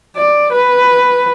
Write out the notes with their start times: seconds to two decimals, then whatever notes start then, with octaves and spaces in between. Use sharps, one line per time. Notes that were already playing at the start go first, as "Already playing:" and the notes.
0.16 D5
0.52 B4